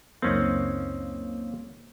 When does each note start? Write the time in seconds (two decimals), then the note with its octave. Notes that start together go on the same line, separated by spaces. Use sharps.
0.22 C#2 F#2 A#3 C4 C#4 D#4